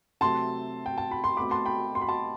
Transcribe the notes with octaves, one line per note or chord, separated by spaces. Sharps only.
C3 F#3 A3 C4 A5 C6
G5
A5
B5
C6
B2 A3 C4 B5 D6
A5 C6
G5 B5
C6
B5
A5 C6